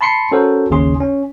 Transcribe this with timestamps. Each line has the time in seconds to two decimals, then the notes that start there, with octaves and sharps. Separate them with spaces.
0.01 A5 B5 C6 C7 C#7
0.32 C#4 F#4 A4 A#4 C5
0.70 G#1 D#2 C#3 C#4 G#4 C6
1.00 C#4